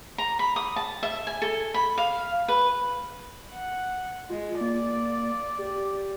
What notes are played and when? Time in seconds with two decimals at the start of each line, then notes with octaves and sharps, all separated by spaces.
0.18 A#5
0.39 B5
0.56 D#6
0.76 A5
1.03 E5
1.27 G#5
1.42 A4
1.74 B5
1.98 F5
2.48 B4
3.50 F#5
4.30 G#3 F4
4.61 A#3 D5
5.59 G4